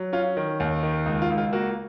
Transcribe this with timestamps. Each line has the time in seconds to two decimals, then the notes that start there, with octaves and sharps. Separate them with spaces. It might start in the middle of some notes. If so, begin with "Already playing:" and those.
Already playing: F#3
0.13 C#4 F4
0.37 D#3
0.60 D#2
0.83 D#3
1.06 C#2
1.22 F4
1.30 C#2
1.38 F4
1.53 A#3 F#4